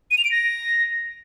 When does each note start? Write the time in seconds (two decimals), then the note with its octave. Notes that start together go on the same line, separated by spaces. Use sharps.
0.11 D#7
0.18 F7
0.25 D7
0.31 A#6